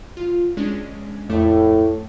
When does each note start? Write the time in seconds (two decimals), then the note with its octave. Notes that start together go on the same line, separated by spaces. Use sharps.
0.17 F4
0.57 G#3 C#4 D4
1.29 F2 A2 A3 D6